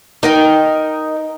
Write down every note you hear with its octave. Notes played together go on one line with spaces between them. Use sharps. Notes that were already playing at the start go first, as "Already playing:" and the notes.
D#4 A#4 G5